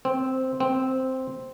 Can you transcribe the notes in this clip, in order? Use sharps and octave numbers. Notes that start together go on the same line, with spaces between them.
C4
C4